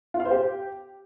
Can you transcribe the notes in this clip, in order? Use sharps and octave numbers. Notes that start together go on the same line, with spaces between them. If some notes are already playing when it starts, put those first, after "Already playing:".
F4
F5
C5
G4